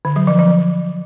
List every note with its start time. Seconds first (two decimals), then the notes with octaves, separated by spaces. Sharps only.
0.05 D3
0.16 F#3
0.27 F3
0.39 F3